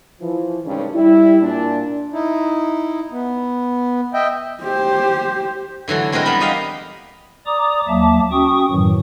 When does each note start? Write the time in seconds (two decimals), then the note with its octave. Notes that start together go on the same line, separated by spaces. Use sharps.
0.21 E3 F3
0.65 G2 C3 D#3 G#3 C#4
0.94 G3 E4
1.41 A#2 D4
2.13 D#4 E4
3.12 B3
4.14 D#5 E5 G5
4.62 G4 C5
5.88 D3 E3 F#3 A3
6.12 G#3 C4 A#4 B4 G5
6.25 G3 B3 A#4 B5
6.40 G4 D#5 F5 G5
7.46 D5 A#5 D6 D#6
7.88 D#2 F#3 A#3 E5 A5 D6
8.32 C#4 F#4 G5 C#6 D#6
8.71 F#2 A2 D#3 E3 F#3